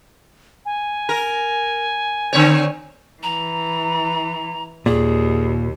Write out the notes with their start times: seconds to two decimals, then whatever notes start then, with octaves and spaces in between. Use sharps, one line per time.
0.65 G#5
1.09 A#4
2.33 D3 C4 C#5
3.23 E3 A#5
4.86 D#2 A#2 G#4